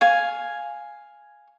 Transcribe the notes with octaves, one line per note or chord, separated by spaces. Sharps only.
F5 G#5